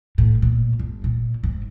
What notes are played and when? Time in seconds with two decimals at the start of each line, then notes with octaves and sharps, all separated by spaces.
0.18 A2
0.42 A#2
0.79 G1
1.04 A#2
1.44 G#2